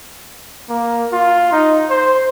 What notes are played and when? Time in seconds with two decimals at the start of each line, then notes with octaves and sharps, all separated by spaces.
0.69 A#3
1.12 F4
1.52 D#4
1.90 C5